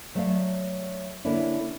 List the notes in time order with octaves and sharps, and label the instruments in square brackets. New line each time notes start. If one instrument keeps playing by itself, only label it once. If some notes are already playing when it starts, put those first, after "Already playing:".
[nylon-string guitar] F#3 A3 C#5 D5 F5
D3 A#3 C#4 D4 E4